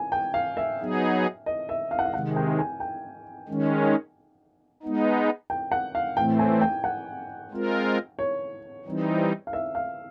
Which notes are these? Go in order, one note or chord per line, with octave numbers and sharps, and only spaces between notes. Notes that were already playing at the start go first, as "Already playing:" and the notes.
Already playing: G#5
G5
F5
E5
F#3 B3 D#4 G#4
D#5
E5
F5
F#5
F5
C3 D#3 G#3 F#5
G5
G#5
G5
D#3 G#3 C#4
G#3 B3 D#4
G5
F#5
F5
A2 E3 A3 C4 G5
G#5
G5
F#5
G#3 C4 F4 A#4
C#5
E3 G3 C4 D#4
F5
E5
F5